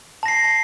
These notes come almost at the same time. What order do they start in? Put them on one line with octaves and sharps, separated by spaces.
A5 A#6 C7